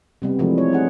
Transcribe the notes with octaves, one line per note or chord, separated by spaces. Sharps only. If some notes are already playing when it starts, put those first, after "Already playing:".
C3 G3 B3
C3 E3 F3 G#3 A3
C#5
D#4 G#4 F#5